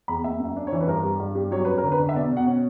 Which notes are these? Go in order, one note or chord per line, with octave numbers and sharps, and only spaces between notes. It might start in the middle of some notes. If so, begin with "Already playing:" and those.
E2 B5
A#3 E5
F#2
E5
D4
C#5
E3
B4
G2 A#4
G3
G2
G3
F#3 C#5
C#4 B4
A#4
D3
B4
D3
E5
B2 D5
B2
F#5
C#4